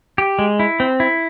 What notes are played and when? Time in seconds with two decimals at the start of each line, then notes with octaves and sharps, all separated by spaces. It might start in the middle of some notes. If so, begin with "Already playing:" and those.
0.18 G4
0.39 G#3
0.60 E4
0.80 C4
1.00 E4